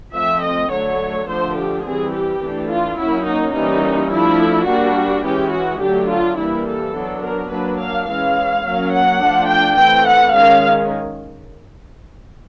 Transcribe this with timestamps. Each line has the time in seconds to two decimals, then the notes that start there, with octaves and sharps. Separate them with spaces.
0.14 F3 A3 C4 E5
0.43 D#5
0.72 D3 F#3 A3 C#5
1.28 D3 F3 A3 D4 C5
1.56 G4
1.84 E3 G3 C4 G#4
2.13 G4
2.41 E3 A3 D4
2.70 F4
2.98 F#3 A#3 C#4 E4
3.26 D#4
3.55 E3 G3 A#3 C#4 D#4
4.11 F3 A3 D4 E4
4.68 G3 A#3 D4 F#4
5.25 E3 G#3 C#4 G4
5.53 F#4
5.81 D3 F#3 A3 D4 G4
6.10 F4
6.38 E3 G3 A#3 E4
6.66 A4
6.95 F#3 B3 D4
7.23 A#4
7.51 F#3 A#3 D4 B4
7.79 F5
8.08 E3 G#3 C#4 F5
8.65 F#3 A#3 C#4
8.93 F#5
9.21 F3 A3 D4
9.50 G5
9.78 E3 A3 C4 G5
10.06 F#5
10.35 D#3 G#3 C#4 F5